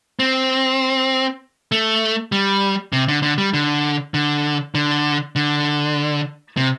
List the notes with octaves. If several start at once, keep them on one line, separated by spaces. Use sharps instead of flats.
C4
A3
G3
C3
D3
D3
G3
D3
D3
D3
D3
C3